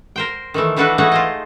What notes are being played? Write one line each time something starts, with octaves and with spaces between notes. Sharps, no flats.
A#4 C5 G5
D#3 E3 A3
E3 G3 D4 F#4 A4 B4
E3 A3 D#4 F#4 G#4 F#5
F4 C5 D#5